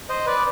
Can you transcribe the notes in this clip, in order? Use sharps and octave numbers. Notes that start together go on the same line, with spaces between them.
C5 D#5
B4 D5